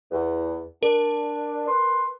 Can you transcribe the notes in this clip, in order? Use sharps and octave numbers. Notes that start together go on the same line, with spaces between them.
E2
D4 A#4
B4 C6